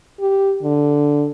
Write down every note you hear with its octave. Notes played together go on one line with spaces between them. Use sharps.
G4
D3